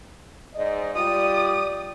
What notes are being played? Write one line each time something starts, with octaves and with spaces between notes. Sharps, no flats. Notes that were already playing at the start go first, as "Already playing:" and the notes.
G#2 D5 D#5
G3 F4 D5 D#6